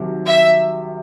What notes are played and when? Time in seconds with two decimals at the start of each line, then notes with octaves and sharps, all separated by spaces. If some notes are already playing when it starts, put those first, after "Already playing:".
Already playing: C2 C3 D#3 F#3
0.26 E5